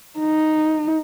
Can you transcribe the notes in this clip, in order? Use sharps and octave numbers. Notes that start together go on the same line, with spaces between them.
D#4